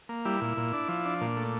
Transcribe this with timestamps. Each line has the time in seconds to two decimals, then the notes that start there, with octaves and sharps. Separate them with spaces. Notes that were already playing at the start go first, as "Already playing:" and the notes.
0.09 A#3
0.25 G3 E4
0.41 A#2
0.57 A#2
0.73 D4
0.88 F3
1.05 D4
1.21 A#2
1.36 A3